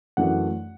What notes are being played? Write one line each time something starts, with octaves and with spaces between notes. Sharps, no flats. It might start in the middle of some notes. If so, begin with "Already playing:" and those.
F#2 E3 A3 D4 F#5